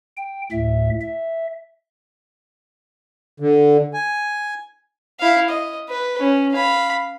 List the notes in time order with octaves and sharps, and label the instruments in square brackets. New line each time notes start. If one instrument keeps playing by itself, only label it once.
[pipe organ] G5
D2 A2 E5
E5
[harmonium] D3
G#5
[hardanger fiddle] E4 F5
D#5
B4
C#4
F5 B5